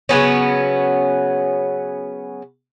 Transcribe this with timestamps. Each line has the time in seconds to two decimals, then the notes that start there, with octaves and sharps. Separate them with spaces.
0.09 C#3 F#3 B3 C#4